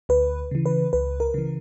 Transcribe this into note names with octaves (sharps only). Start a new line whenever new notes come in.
D2 B4
C#3 E3
B4
C#2 B4
A#4
C#3 E3